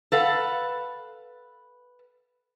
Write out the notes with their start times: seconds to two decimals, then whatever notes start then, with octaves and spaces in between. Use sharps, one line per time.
0.12 A4 B4 F5 F#5